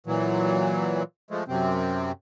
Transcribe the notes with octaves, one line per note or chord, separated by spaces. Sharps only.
A#2 E3 F#3
F3 G#3 A3
F#2 C3 C4